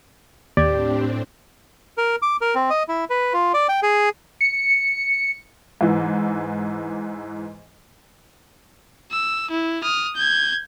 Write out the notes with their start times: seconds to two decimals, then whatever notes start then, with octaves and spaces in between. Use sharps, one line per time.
0.57 D#2 A2 C4 D4 G4 D5 G#6
1.98 A#4
2.22 D6
2.41 A#4
2.55 C4
2.70 D#5
2.88 E4
3.10 B4
3.33 F4
3.54 D5
3.69 G5
3.83 G#4
4.41 C#7
5.81 G#2 E3
9.12 E6
9.51 E4
9.83 D#6 F6
10.16 G6 G#6